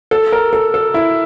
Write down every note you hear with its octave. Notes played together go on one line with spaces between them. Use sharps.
A4
A#4
A4
A4
E4